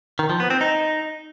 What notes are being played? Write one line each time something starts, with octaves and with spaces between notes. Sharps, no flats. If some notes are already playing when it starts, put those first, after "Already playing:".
D#3
F3
B3
C4
D#4